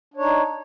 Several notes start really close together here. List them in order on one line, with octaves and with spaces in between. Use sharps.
D4 C#5 D#4